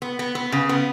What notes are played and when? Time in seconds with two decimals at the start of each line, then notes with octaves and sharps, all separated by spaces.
0.02 B3
0.19 B3
0.35 B3
0.52 C#3
0.69 B3